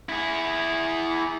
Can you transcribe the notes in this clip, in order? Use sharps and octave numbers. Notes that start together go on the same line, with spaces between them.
E4 G#4